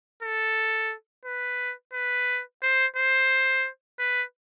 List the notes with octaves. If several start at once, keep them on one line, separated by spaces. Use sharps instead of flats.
A4
B4
B4
C5
C5
B4